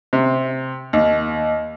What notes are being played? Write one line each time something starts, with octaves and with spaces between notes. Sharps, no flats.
C3
D#2